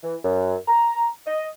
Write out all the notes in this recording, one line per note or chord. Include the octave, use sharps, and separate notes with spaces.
E3
F#2
A#5
D#5